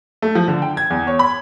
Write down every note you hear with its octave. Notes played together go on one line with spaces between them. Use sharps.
A3
F3
D3
G5
G#6
E2
C#5
B5